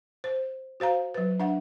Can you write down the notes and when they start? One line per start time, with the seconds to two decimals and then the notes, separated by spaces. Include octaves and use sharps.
0.24 C5
0.80 F#4 C5 F5 A#5
1.14 F#3 B4
1.40 D4 E5 F#5